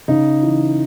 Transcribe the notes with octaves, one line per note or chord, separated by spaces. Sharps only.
C#3 D#4
E3